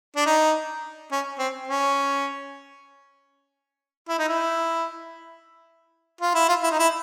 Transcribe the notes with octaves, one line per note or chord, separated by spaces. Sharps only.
D4
D#4
C#4
C4
C#4
E4
D#4
E4
F4
E4
F4
E4
D#4
E4